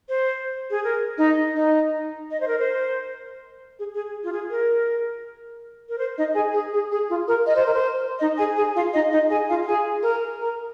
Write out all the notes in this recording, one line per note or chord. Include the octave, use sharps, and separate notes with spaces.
C5
G#4
A#4
D#4 D#5
D#4 D#5
D#5
C5
A#4
C5
G#4
G#4
F4
G#4
A#4
A#4
C5
D#4 D#5
G#4 G#5
G#4
G#4
G#4
F4
A#4
D#5
C5
A#4
C5
D#4 D#5
G#4 G#5
G#4 G#5
F4 F5
D#4 D#5
D#4 D#5
G#4 G#5
F4 F5
F5
G#4 G#5
A#4 A#5
A#4 A#5